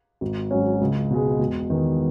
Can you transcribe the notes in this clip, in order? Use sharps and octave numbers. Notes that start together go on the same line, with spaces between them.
G#1
G#2 F#3 C#4
C#2
B2 G#3
E1
E2 D#3